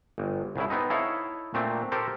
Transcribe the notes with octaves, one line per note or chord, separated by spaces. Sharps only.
G1
C2 C#3 E4
B3 C4 D#4
D#4 E4 A4 C#5 E5 F5
A#2 A3 C4 D4
G4 A4 A#4 C5